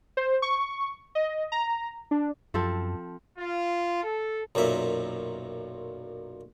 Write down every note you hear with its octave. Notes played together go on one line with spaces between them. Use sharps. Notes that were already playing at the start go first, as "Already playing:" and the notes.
C5
C#6
D#5
A#5
D4
F#2 F3 C4 A4
F4
A4
B1 F#2 A#2 E5